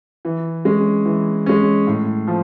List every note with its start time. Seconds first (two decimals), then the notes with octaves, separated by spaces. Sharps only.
0.25 E3
0.65 G#3 C#4
1.05 E3
1.46 G#3 C#4
1.87 A2
2.27 F3